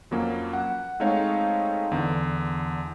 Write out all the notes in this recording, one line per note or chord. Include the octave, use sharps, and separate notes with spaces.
F2 F#3 A#3 C#4
F#5
G#3 A3 C4 D#4 C#5 F5
E2 D3